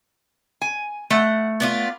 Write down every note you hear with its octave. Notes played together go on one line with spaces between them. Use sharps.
G#5
A3 F#5
B3 D4 F4